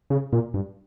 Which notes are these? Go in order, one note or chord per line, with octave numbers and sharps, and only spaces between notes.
C#3
A#2
G2